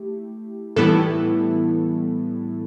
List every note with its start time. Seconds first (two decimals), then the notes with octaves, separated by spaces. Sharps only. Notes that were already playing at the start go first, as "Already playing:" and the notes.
Already playing: A3 E4 G4
0.76 A2 E3 G3 B3 E4 A4